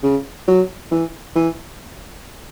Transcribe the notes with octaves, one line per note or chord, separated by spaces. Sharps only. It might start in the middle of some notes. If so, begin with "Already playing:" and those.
C#3
F#3
E3
E3